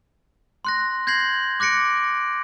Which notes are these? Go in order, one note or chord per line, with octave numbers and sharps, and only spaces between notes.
C6 F#6 A#6
G6 G#6 A#6 C7 F#7
D6 F#6 A#6 C#7 D7